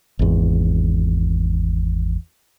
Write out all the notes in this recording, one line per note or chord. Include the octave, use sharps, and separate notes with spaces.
G#1 E2